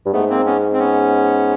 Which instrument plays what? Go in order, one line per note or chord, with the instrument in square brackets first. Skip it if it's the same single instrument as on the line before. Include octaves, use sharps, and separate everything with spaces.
[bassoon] G2
[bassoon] G#2 [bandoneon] A3 B3
[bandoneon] A#3 C4
B3 C#4
C4
B3 C#4